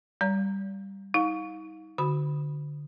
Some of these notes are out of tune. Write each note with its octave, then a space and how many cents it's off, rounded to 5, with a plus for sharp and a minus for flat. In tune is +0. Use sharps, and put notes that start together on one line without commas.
G3 +0 D5 -45 A#5 +0
D#4 +40 F5 +30
D3 +0 F#4 +0 B5 -5